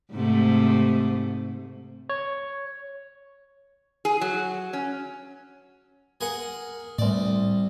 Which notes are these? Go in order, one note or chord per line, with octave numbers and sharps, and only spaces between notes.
G#2 C3 A3
C#5
G#4
F#3
C#4
G#4 A#4 F#5
C2 A2 D5